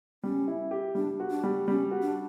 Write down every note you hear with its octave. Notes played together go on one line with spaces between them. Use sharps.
G3 C#4
E4
G4
G3 D4
F#4
D4
G3
G3 C#4
F#4
D4